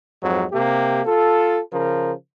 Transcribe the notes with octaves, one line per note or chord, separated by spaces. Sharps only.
F2 G#2 F#3
C3 A#3 G4
F4 A4
C#3 F3 A#4